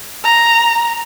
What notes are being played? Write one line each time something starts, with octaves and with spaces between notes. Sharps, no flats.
A#5